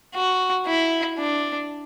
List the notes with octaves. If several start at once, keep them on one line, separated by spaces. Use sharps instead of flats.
F#4
E4
D4